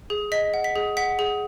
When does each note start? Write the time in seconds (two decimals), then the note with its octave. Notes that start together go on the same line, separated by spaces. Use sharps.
0.10 G#4
0.32 D#5 B6
0.54 F#5
0.64 B6
0.76 G#4
0.97 F#5 B6
1.19 G#4